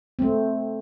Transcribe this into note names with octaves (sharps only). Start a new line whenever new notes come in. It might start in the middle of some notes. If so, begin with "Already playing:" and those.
A3 C4